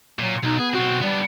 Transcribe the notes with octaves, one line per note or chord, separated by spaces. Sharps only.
A#2 F#3
B1 D#4
B3 G#4
B1 C4 F#4
G3 B3 D4